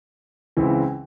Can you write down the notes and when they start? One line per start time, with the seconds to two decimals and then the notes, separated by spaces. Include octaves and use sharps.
0.57 C#2 C#3 E3 C4 E4